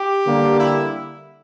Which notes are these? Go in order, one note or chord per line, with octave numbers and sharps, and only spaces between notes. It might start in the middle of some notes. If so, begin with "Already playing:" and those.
Already playing: G4
D3 G3 A#3
E4